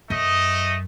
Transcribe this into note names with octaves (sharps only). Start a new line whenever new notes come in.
F#2 A3 D#5